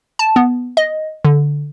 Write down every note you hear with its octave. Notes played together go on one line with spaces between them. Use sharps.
A5
B3
D#5
D3